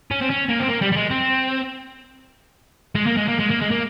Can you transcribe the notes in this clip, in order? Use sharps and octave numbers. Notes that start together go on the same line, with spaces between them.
C#4
C4
C#4
A#3
C4
A#3
G3
G3
G#3
C4
G#3
A#3
G#3
A#3
G#3
A#3
G#3
A#3